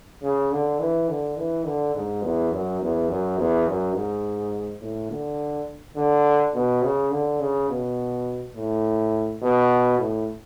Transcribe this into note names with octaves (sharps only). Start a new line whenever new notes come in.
C#3
D3
E3
D3
E3
D3
G#2
E2
F#2
E2
F#2
E2
F#2
G#2
A2
D3
D3
B2
C#3
D3
C#3
B2
A2
B2
A2